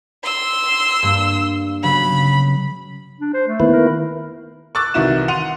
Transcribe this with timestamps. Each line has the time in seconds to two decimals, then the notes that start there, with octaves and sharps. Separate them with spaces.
0.24 C6 E6
1.03 G2 A#3 D7
1.83 C#3 F#3 B3 B5
3.20 D4
3.34 C5
3.48 A3
3.60 D#3 A#3 B3 E4 B4
3.72 A#4
4.75 C#6 D6 E6 F#6 A6
4.94 C2 D#3 E3 F#4 E5 E7
5.28 F#5 C6 D#7 F7